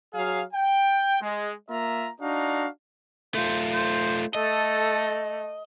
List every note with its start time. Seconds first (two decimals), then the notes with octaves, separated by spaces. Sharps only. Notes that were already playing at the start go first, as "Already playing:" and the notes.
0.14 F#3 G#4 F5
0.54 G5
1.21 G#3
1.70 A#3 F4 E5 A#5
2.21 D4 D#4 F#4 F5
3.35 A3 F4 C5
3.74 C5
4.35 A3 A4 D#5